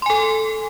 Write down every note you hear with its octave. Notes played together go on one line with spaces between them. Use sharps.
A4 G#5 C6